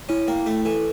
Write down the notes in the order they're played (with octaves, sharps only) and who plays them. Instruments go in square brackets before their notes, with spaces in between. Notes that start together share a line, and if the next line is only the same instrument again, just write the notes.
[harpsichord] C#4 [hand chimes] E4
[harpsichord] A#3 [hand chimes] G5
[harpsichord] A3 [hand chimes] E4
[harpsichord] E3 [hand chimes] A4